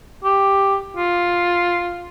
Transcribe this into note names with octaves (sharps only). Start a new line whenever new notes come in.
G4
F4